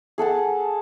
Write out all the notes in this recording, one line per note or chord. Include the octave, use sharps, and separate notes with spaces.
G#4 A4 F#5 A5